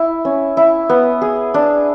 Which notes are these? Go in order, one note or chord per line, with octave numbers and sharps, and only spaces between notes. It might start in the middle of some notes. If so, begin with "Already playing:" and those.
Already playing: E4
C#4
E4
B3
G#4
D4